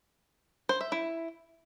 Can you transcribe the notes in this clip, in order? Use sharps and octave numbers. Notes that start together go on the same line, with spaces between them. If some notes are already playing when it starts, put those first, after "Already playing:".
C5
E5
E4